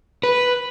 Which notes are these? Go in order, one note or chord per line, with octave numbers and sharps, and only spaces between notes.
B4